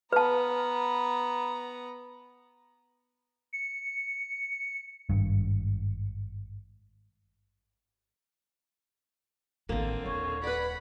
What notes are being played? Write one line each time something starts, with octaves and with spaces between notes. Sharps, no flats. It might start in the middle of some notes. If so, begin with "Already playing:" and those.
B3 B4 A5 A#5
C#7
G#1 G2
A1 D3 D#3 A#3 C4
D#1 C#5
B4 D5 F#5 B5